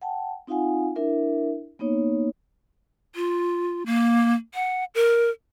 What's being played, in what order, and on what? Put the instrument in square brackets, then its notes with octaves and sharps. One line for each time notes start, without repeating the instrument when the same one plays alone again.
[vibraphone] F#5 G5 A5
C4 D#4 F4 F5 F#5 G#5
D4 E4 A#4 E5
A#3 B3 D#4 C#5
[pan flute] F4
A#3
F#5
A#4